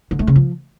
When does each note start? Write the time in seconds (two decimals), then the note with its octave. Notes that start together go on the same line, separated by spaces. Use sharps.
0.11 D3
0.19 A3
0.27 C#3
0.36 F3